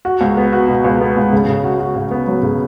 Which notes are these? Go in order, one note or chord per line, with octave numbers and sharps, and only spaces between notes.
F#4
C#2
B3
F#4
B2
C#2
B3
C#2
C#3
C#3
F#4
F#4
C#3
B3
F#3
C#3